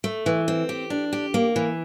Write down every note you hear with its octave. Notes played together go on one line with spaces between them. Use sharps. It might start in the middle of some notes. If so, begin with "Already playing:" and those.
A3
E3
C4
G4
D4
G4
A#3
E3